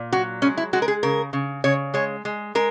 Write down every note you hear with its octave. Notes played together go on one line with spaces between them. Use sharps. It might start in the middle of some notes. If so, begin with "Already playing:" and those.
Already playing: A#2
F#3 F#4
G#3 C#4
E4
G#3 F#4
A#4
G#4
C#3 A#4
C#3
C#3 C#5
G#3 C#5
G#3
G#3 A#4